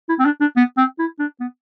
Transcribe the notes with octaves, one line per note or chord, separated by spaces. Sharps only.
E4
C4
D4
D4
B3
C4
E4
D4
B3